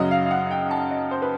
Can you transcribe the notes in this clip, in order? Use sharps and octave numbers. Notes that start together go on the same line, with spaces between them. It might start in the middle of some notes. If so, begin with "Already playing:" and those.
Already playing: F#2 C#3 F#3 D#5
F5
F5
F#5
G5
A5
D#5
C5
B4